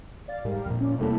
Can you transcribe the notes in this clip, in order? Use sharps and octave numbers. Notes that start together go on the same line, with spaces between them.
D5 F5 A6
G#2 G3 A#4 F5
F2 A#2
C#4 F4 D5
C3 G3 A3 A#3 E4 A4